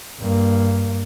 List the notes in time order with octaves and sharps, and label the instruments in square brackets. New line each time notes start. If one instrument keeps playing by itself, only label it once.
[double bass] G2 A#3